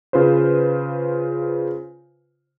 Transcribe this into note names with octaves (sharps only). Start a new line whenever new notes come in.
C#3 F4 B4 C5